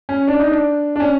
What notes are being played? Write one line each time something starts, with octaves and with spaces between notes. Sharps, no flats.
C#4
D4
D#4
D4
D4
C#4